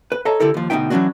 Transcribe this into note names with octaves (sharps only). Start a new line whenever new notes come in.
B4
A4 C#5 D#5 E5 A5 A#5
D3 E4 G4 A4 A#4
D#2 F3
D2 B2 E3 D#4 E5 G5
E3 F#3 A3 C#4 D4 F#4